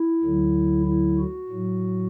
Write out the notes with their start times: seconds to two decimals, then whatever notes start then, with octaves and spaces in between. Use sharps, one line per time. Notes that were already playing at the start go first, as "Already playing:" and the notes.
Already playing: E4
0.23 D2 D3 F#3
0.86 E4
1.19 F#4
1.49 A2 F#3